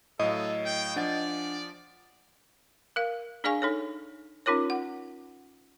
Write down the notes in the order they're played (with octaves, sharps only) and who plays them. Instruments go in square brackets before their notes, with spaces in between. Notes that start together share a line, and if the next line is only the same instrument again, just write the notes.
[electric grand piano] A2 F#3 F5 [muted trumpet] A4 [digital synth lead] D#5
[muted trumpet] G5
[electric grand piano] F3 [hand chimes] D4 F#5 A6 [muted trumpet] D5
[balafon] A#4 F5
D4 G#4 D5 F5 G#5 C#6
D#4 A4 C#5
C#4 D#4 F4 A#4 C#5
F#5